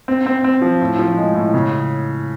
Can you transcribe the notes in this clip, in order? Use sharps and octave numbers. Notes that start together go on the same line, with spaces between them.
C4
C4
C4
F3
A2
F3
G#3
A2
C#3